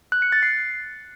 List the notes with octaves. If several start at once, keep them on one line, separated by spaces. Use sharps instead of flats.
F#6
C#7
A6
C7